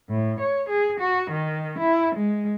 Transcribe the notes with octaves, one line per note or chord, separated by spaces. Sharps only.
A2
C#5
G#4
F#4
D#3
E4
G#3